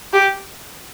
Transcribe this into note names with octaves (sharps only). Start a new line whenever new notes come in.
G4